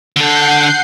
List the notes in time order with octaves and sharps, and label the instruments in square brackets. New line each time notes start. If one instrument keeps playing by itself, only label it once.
[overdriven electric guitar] D3 A4 [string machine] F#5 G6 C7